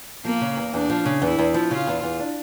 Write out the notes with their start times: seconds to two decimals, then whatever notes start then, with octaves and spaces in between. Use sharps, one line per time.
0.25 F3 A#3
0.41 C#3
0.57 E2
0.73 E2 D4
0.90 F3
1.06 C#3
1.22 E2 E4
1.38 E2
1.54 F3
1.71 C#3 F4
1.87 E2
2.03 E2
2.19 D4